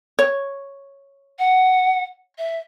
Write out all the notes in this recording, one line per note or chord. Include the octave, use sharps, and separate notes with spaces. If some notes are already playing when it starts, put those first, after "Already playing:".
C#5
F#5
E5